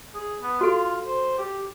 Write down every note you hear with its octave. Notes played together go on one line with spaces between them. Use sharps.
G#4
B3
F4 F#4 A4
C5
G4